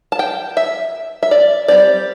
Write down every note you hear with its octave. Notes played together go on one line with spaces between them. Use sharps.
A5
G5
E5
E5
D5
G3 C4 D5